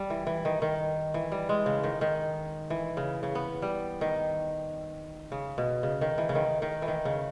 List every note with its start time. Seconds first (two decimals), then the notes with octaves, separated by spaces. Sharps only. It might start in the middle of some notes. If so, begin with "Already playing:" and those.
Already playing: G3
0.10 E3
0.27 E3
0.45 D#3
0.62 D#3
1.14 E3
1.32 G3
1.49 G#3
1.66 C#3
1.83 D#3
2.01 D#3
2.70 E3
2.97 C#3
3.23 C#3
3.35 B3
3.62 G3
4.01 D#3
5.32 C#3
5.58 B2
5.83 C#3
6.01 D#3
6.18 E3
6.29 C#3
6.35 D#3
6.62 D#3
6.82 E3
6.88 D#3
7.05 C#3